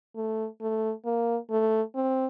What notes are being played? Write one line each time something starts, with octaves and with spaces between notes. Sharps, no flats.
A3
A3
A#3
A3
C4